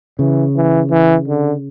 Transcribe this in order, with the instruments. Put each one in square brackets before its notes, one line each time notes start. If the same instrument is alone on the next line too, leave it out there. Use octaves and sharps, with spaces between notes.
[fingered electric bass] C#3 [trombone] E3
[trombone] E3
E3
D3